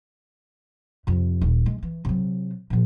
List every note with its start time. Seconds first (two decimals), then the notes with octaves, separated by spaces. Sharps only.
1.07 F2 C3
1.41 D#1
1.66 G#3
1.83 E3
2.05 C3 F#3
2.70 A#2 F3